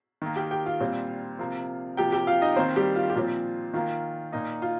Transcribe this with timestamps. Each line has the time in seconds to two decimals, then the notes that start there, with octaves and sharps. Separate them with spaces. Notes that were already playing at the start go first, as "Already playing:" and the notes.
0.22 D#3 A#3
0.36 G4 G5
0.51 G4 G5
0.66 F4 F5
0.80 A#2 G3 C4
1.39 C3 F3 A#3
1.97 C3 F3 A#3 G4 G5
2.12 G4 G5
2.27 F4 F5
2.42 D#4 D#5
2.56 D#3 A#3 C4 C5
2.76 G3 G4
2.96 F4
3.10 G4
3.15 A#2 F3 C4 F4
3.74 D#3 A#3 F4
4.32 A#2 A#3 D#4
4.62 F4